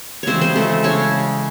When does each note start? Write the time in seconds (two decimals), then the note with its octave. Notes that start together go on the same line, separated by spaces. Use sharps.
0.23 C#3 E3 G#3 C4 C5 C#5
0.41 C4 C5
0.56 A3 A4
0.83 C#3 G#3 C#4 C#5